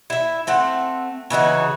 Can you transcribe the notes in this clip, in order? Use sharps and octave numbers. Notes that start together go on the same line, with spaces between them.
E4 E5
A3 C4 F#5
C#3 E3 D#4 F#4